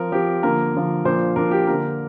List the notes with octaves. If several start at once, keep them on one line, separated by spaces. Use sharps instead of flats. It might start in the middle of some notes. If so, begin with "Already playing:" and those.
Already playing: F3 C4 A#4
F3 C4 G4
D3 F3 A#3 A#4
D3 F3 A#3
A#2 F3 A#3 D4 C5
A#2 F3 A#3 D4 A#4
G4
D3 A#3 D4 A#4